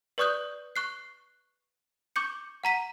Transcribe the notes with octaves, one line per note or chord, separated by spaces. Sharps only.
B4 D5 C#6 D#6 F#6 G6
C#6 F#6 C7
C#6 D6 G6 C#7
F#5 A#5 B6 D#7